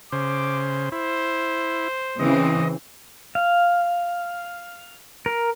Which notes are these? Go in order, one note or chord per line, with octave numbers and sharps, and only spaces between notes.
C#3 C5 D6
E4 C5
C#3 E3 C4 D#5
F5
A#4